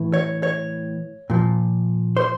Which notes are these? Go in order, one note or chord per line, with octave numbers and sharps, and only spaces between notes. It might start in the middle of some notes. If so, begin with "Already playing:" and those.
Already playing: A2 E3
C#5
C#5
A#2 F3
C5